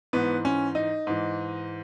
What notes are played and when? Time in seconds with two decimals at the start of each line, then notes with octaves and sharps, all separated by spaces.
0.13 G#2 E3 B3
0.45 C#4
0.75 D#4
1.07 G#2 E3